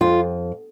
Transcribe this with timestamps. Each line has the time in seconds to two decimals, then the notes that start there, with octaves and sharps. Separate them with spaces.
0.01 F2 F4